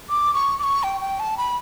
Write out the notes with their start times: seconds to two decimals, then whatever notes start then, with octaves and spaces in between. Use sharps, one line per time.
0.10 D6
0.34 C#6
0.59 D6
0.64 C#6
0.83 G5
1.01 G5
1.20 A5
1.38 B5